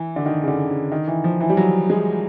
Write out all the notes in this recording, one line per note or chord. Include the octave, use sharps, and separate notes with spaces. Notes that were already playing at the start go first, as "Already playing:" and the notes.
Already playing: E3
D3
D#3
C#3
D3
C#3
D#3
E3
F3
E3
G3
F#3
G#3